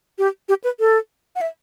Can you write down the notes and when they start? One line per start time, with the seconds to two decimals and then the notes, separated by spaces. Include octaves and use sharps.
0.18 G4
0.49 G4
0.64 B4
0.80 A4
1.36 F#5
1.41 E5